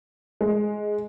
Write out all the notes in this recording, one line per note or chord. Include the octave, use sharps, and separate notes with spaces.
G#3